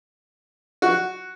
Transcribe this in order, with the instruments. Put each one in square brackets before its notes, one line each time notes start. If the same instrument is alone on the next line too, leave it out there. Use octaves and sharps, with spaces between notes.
[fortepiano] F#4